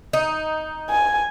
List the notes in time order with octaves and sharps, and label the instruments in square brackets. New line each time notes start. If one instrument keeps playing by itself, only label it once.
[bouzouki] D#4
[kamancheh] G#5